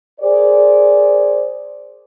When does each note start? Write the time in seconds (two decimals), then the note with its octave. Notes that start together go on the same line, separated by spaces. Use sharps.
0.19 G#4 A#4 C5 D5